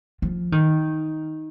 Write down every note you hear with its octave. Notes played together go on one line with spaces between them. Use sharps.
F3
D#3